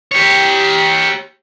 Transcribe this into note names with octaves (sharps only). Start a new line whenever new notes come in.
G4 C#5